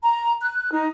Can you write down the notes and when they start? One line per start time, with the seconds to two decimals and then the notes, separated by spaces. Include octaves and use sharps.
0.03 A#5
0.42 F#6
0.72 D#4